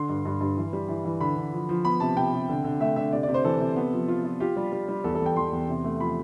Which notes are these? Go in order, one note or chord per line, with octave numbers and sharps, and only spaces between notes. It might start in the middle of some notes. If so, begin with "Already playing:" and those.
Already playing: D3 C6
G2
G2
G2
E3
G3
E3
E3
D3 B5
D3
F3
F3
B3 B5
C3 A5
C3 G5
C3
D3
D3
A3 E5
D3 E5
C3 D5
D5
C3
C5
E3 A4
C3
B3
F3
F4
F4
F4 G4
G3
G3
G3
E2 A4
A4
E2
G5
E2 C6
E2
C3
A3
F3 B5